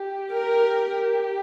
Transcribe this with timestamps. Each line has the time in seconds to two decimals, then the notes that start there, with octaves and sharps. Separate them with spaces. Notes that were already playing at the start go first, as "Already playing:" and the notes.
Already playing: G4
0.32 A#4